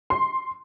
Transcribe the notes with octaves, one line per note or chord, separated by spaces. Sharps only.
C6